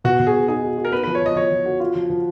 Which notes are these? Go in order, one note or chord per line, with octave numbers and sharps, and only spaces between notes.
B2 F#4
B2
G#4
F#4
D#4 G#4
F#4
F#4
A#4
B3 B4
F3 B4
C#5
F3 D#5
F3 C#5
F3
F#4
F4
F3
F3